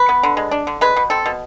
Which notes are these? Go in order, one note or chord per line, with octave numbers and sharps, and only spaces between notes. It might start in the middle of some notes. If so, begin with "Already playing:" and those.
Already playing: B4
B3
D3
G#3
D4
D3
G#3 B4
B2
C4 A4
B2